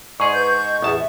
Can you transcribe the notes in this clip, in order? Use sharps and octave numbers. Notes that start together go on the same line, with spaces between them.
G#2 G#4 D5 C#6
B4 G6
D#5
A1 E2 G#4 A5 D#6
E5